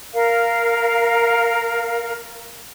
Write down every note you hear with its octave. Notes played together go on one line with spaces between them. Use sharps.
A#4 F5